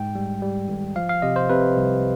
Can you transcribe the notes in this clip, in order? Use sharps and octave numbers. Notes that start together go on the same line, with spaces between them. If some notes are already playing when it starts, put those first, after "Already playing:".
Already playing: G#2 G#3 G5
G3
G3
G#1
F3 F5
F5
C3 D#5
C5
C3 B4
C2